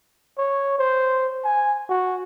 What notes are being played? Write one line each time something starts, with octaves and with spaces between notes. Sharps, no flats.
C#5
C5
G#5
F#4